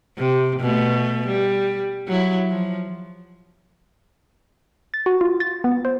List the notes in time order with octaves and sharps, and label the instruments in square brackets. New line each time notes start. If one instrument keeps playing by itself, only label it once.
[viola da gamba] C3
B2 A3
G3
F#3 E4
F3
[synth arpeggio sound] A6
F#4
F4
A6
B3
C5